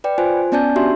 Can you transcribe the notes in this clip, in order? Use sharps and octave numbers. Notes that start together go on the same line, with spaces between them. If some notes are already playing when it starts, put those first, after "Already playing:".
B4 D5 G5
F4 C5 G#5
B3 C#4 D5 G#5 A5 G6
D4 F#4 G4 E5 C6